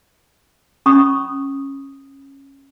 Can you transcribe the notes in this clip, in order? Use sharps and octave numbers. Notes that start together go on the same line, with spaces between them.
C#4 B5 C#6 D#6